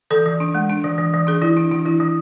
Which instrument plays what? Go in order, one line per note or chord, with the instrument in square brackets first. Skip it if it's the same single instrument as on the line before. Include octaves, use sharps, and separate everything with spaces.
[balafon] E3 A4
E3
D4
G#3
D4
E3
E3
E3
D4 G#4
E3 E4
D4
E3 D4
E3 E4
E3